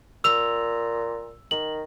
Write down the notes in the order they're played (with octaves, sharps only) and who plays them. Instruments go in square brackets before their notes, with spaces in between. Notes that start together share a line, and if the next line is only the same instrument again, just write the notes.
[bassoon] A#2 [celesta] E6 F7
[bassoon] D#3 [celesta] F#7